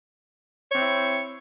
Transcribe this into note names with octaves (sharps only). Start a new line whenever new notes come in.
C4 E4 C#5